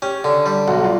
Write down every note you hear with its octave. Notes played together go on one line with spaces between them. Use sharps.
C#4 G4
D3
G3
B1 F#4
F4